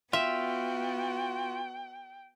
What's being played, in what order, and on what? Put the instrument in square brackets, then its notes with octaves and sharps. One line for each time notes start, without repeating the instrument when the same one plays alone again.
[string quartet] B3 F#4 [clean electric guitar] F4 [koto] E5 [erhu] G5